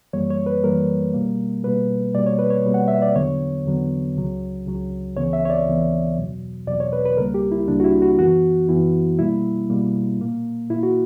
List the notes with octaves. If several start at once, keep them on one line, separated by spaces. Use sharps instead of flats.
F#2 E3 G3 A#3 C#5
C#5
B4
F#2 E3 G3 A#3 A#4
B2 G3 A#3
B2 G3 A#3 B4
B2 G3 A#3 D5
C#5
B4
C#5
B2 G3 A#3
F#5
E5
D5
E2 D3 F#3 B3 C#5
E2 D3 F#3 B3
C#2 C#3 F#3
C#2 C#3 F#3
C#2 C#3 E3 B3 C#5
E5
C#5
D5
C#2 C#3 E3 B3
E2 B2 F#3
E2 B2 F#3 D5
C#5
B4
B4
C#2 C#3 G3 A#3 A#4
G4
E4
C#2 C#3 G3 A#3 D4
F#4
E4
F#4
F#2 E3 B3 F#4
F#2 E3 B3 E4
B2 G3 A#3 E4
B2 G3 A#3
A#2 A#3
A#2 A#3 E4
F#4